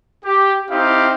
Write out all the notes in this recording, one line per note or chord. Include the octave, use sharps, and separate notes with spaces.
G4
C4 D#4 E4 G4 F5